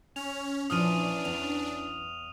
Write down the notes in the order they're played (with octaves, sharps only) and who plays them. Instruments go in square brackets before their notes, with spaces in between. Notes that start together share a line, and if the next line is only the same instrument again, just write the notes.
[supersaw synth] C#4 [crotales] F7
[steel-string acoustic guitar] A#2 F3 [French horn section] E3 C#4 [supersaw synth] D4 [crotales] D#6 F6 D#7
[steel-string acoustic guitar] E2 [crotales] F7